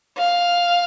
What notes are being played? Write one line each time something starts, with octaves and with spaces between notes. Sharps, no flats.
F5